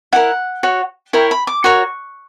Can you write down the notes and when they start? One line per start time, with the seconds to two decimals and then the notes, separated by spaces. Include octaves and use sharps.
0.13 E4 G4 A#4 F#5
0.63 F#4 C#5
1.13 E4 A#4 C#5 G5
1.31 B5
1.47 D6
1.64 F#4 A#4 C#5 C#6